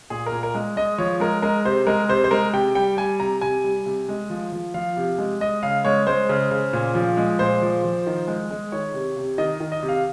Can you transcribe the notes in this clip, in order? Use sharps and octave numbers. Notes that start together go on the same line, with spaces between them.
A#2 G#4
A#4
A#2
A#4
G#3
G#3 D#5
F3 C#5
G#3 A#4
G#3 A#4
C3 C5
G#3 A#4
C3 C5
C5
G#3 A#4
C3 G5
G3 G5
G3 G#5
C3 A#5
C3 G#5
G3
C3
G#3
F3
F3
F3 F5
C3
G#3
G#3 D#5
C#3 F5
G#3 C#5
G#3 C5
C#3
C#3
A#2
F3
G#3
A#2 C5
F3
F3
D#3
G#3
G#3
D#3 C#5
C3
C3
D#3 D#5
D#3
D#5
C3
F5